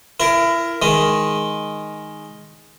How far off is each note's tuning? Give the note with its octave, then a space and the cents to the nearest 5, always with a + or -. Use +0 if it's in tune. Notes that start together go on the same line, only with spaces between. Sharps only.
E4 +30 A#4 +0
D#3 +0 G#3 +0